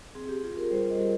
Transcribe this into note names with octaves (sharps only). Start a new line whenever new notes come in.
C4 G#4
G4
F4 G#4
A#4
G3 C5
D#5
G3